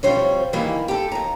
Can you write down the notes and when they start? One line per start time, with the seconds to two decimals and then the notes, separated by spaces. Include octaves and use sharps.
0.03 F2 B2 G3 C5 C#5
0.53 D#3 E3 G3 A#3
0.88 G4 A4
1.12 D#2 A#5